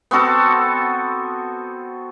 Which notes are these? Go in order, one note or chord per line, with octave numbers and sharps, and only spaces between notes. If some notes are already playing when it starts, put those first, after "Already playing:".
B3 C4 F#4 A4